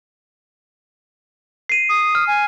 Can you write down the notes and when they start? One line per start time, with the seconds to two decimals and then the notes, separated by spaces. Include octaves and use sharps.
1.69 C7 D#7
1.89 D#6
2.15 F6
2.27 G#5